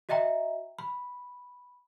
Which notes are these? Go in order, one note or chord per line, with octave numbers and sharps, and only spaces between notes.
F#4 D#5 E5 G5 A#5
B5